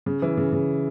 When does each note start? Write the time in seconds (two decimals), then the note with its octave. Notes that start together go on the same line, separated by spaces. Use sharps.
0.06 C#3
0.22 E3
0.37 C#3
0.52 C#3